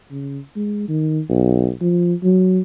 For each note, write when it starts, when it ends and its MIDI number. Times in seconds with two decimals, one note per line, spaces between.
0.11 0.39 49
0.56 0.85 56
0.88 1.20 51
1.29 1.70 35
1.81 2.14 53
2.23 2.61 54